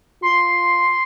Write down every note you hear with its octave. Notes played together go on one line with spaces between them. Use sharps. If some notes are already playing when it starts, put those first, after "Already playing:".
F4 C6